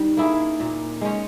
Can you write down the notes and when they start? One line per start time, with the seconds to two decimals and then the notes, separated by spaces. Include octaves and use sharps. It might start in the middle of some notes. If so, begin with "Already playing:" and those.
Already playing: G3 D#4
0.17 A#3 E4 G#4
0.60 A#2
1.01 G#3 C#4